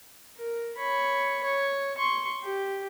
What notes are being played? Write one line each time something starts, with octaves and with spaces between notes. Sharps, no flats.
A#4
C#5 B5
C#5
C6 C#6
G4